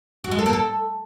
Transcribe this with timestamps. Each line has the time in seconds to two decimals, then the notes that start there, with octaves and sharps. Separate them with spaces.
0.24 F#4
0.31 G#3
0.39 A4
0.46 A#3
0.53 A4